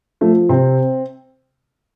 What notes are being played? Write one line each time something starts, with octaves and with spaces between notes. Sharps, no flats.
F3 A3
C3 C4